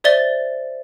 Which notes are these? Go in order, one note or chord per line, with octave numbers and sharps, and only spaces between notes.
C5 D5 E5 A6 G7